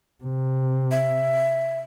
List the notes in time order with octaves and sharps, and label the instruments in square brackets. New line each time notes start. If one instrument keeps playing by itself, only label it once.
[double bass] C3
[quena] E5